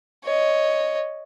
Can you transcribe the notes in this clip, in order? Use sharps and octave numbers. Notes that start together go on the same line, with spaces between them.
C#5 D#5